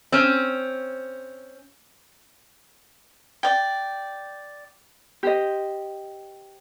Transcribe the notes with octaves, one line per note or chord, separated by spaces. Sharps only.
C4 C#4
D5 G5
G4 C5 D#5